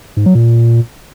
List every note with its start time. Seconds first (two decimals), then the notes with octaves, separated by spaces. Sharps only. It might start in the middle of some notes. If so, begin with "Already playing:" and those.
0.17 G#2
0.26 F#3
0.35 A#2